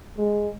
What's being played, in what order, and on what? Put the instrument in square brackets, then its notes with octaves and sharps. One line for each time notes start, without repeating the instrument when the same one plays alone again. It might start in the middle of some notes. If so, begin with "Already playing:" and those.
[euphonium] G#3